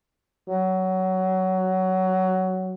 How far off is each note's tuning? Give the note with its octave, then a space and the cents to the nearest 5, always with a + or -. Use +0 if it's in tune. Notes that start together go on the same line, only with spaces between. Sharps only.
F#3 +15